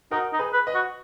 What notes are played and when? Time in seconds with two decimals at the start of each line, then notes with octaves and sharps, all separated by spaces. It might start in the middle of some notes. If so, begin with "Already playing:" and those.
0.11 D#4 F#4 A#4
0.33 D#4
0.39 G#4 B4
0.53 B4
0.67 B4 D#5
0.75 F#4